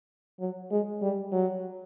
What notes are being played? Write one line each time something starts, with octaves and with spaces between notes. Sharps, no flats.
F#3
G#3
G3
F#3